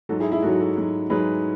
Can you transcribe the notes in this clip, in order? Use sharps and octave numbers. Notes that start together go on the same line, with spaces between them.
G#2 F#3 F#4 A4
E4 G#4
E4 G#4
G#2 F#3 F#4 A4
F#4 A4
G#2 F#3
G#2 F#3 G#4 B4